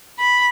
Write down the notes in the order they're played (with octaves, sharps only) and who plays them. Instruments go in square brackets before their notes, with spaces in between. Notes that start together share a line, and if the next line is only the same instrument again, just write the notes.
[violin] B5